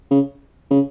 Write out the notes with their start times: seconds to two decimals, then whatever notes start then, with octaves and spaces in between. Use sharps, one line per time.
0.11 C#3
0.71 C#3